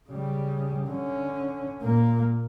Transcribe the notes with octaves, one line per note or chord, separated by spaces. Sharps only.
C#3 G3
D3 C#4
A#2 A#3